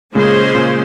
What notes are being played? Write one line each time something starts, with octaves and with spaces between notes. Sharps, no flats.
A#2 C#3 G#3 C#4 G#4 C5
A#2 C#3